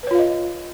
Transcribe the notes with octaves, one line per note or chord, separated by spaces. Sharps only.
F4 B4 C#5 D#5 F5